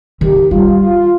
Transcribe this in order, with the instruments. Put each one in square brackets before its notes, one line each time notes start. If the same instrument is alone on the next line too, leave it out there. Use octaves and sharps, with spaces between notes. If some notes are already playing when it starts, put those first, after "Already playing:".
[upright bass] D#3 [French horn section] G4
[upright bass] G3 [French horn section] F4
[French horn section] F4